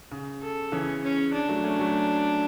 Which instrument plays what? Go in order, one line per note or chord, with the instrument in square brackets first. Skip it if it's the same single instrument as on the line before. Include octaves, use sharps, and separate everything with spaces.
[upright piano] C#3
[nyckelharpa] A4
[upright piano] C#3 E3 [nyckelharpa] C#4
[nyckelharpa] C#4
D4
[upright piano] F#3 A3
A3 C#4
F#3 A3